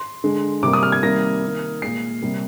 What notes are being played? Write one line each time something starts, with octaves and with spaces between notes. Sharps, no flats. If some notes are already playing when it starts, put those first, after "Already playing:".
Already playing: C6
D3 G#3
C3 G3 A#3 D6
D#6
F6
G#6
C3 D#3 G3 A#3 A#6
D#3 A#3
A#2 G#3 C7
C3 G3 A#3